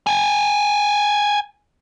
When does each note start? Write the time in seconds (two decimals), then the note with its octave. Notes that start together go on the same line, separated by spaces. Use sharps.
0.07 G5 G#5